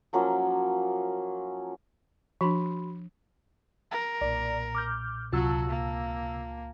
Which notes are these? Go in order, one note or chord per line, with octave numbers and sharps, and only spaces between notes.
F3 F#3 A#3 C#4
F3 D4 F#4 B5 C6
A#4
B1 A#2 D5
D6 F6 G6
C#2 C3 F#3 F4 F#4 A5 E6
A#3